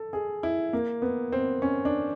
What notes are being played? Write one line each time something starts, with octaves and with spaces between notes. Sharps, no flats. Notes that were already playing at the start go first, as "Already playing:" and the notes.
Already playing: A4
G#4
E4
A#3
B3
C4
C#4
D4